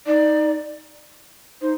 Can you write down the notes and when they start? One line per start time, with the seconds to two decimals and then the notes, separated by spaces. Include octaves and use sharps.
0.07 D#4 D5
1.62 D#4 C5